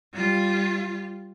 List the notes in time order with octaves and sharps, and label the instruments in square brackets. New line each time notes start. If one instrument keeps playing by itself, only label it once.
[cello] G3 F4